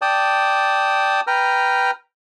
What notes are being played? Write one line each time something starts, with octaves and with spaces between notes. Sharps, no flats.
D5 G5 A5 D#6
B4 G5 A#5 F6